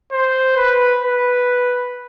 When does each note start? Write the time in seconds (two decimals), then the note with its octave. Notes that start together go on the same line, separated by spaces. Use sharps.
0.12 C5
0.57 B4
1.02 B4